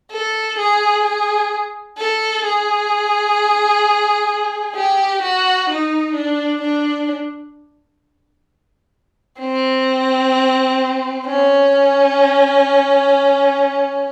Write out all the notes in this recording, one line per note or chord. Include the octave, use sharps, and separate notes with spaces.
A4
G#4
G#4
A4
G#4
G4
F#4
D#4
D4
D4
C4
C#4